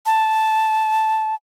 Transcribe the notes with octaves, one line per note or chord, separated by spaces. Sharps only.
A5